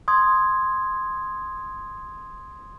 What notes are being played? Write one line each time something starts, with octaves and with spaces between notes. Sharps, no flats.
C6 D#6 G#6